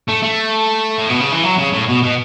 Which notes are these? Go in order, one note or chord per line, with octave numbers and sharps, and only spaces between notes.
A3
A3
A2
B2
C#3
E3
F#3
C#3
A2
B2
B2